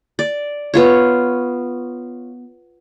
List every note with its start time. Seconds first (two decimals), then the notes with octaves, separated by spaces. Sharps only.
0.19 D5
0.74 B3 F4 C#5